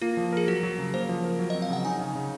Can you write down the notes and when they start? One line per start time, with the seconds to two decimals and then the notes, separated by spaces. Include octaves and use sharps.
0.02 A#3 F4
0.17 F3
0.32 G#4 A#4
0.48 F#3 F#4
0.63 F#3
0.78 C#3
0.94 A#3 C5
1.09 F3
1.24 A#4
1.39 F#3
1.50 C4 D#5
1.62 F5
1.69 C#3 F#5
1.85 D#4 G#5
2.00 C#3
2.15 C#3